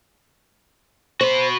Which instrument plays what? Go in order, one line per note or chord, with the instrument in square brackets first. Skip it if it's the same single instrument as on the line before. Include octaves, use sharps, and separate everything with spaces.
[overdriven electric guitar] F#4 B5 [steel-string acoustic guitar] C5